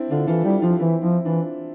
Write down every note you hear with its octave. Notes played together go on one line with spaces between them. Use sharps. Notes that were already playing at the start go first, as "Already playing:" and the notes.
Already playing: C4 D4 E4
D3 D4 F4
E3 F4 A4
G3 E4 G4
F3 D4 F4
E3 C4 E4
F3 C4 E4
E3 D4 F4